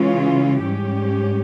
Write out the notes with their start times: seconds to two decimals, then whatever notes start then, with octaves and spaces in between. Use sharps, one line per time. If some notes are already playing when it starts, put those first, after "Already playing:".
Already playing: C#3 E3 G#3 C#4 F4
0.62 G#2 G3 C#4 G4